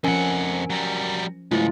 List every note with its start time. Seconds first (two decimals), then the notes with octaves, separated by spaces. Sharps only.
0.04 F2 F3 C#4 A#4 F#5 G#5
0.70 F#3 G3
1.51 C#2 G#2 F#3 A3 E4 F4